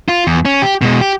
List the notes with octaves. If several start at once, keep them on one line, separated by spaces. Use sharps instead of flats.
F4
E2
C#4
G4
B2 G#3
G4